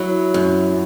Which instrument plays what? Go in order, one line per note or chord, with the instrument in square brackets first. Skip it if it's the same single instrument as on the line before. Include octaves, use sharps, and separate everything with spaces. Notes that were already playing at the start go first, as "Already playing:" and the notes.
Already playing: [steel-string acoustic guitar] F#3 E4
F#2